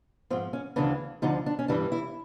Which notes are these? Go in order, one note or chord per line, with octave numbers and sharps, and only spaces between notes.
G#2 F3 C4
C#4
D2 C#3 E3 D4
D2 D3 F3 D#4
D4
C#4
G2 E3 G3 D4
E4